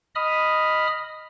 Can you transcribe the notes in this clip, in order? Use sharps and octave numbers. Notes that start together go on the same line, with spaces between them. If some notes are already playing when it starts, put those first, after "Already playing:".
D#5 B5 D#6 F6